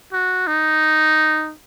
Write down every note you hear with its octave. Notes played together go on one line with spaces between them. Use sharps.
F#4
D#4